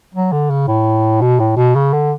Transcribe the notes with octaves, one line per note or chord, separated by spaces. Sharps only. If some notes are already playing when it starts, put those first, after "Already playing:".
F#3
D3
C#3
A2
B2
A2
B2
C#3
D3